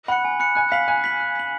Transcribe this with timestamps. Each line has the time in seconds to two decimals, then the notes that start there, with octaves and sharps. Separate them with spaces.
0.08 F#5 B5 F#6 C#7
0.25 G#5
0.40 B5 F#6 C#7
0.55 G#5 F#6
0.72 F5 B6 F#7
0.88 G#5 F#6
1.04 B6 F#7
1.20 F#6
1.35 B6 F#7